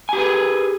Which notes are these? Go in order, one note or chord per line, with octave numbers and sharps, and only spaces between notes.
G4 G#4 B4 G#5